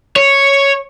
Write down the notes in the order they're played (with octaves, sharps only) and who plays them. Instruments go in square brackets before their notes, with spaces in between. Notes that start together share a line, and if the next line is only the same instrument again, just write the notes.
[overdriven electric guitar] C#5